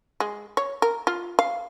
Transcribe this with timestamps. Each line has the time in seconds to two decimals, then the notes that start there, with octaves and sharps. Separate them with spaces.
0.20 G#3
0.57 C#5
0.82 A#4
1.07 F4
1.39 F5